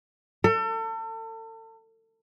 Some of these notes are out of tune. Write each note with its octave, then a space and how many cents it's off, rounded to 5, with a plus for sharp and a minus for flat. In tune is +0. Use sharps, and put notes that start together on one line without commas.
A4 +35